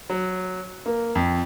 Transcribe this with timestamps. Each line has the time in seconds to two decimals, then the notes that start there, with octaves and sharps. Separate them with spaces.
0.10 F#3
0.86 A#3
1.15 F2